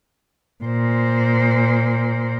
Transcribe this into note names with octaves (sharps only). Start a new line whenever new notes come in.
A#2 C5